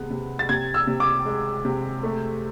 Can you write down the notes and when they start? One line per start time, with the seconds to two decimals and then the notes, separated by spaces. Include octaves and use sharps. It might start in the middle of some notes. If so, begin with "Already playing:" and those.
Already playing: C3 G#3 B3
0.10 C3
0.39 A6
0.49 C3 G#6
0.74 E6
0.87 C3
1.00 D6
1.26 G#3
1.65 C3
2.03 A3